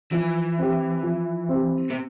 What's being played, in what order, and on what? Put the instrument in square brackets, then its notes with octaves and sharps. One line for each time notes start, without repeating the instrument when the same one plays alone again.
[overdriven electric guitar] E3 [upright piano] F3
[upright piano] C4 G4
F3
C4 G4
[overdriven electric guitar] C3